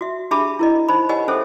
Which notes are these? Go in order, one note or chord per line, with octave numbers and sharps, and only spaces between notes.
F#4 E5
D4 G4 G#4 E5 A5 B5
E4 A#4 D#5
D#4 C5 B5
G4 A#4 C#5 D#5 F#5 G#5
C#4 G#4 A4 C5 E5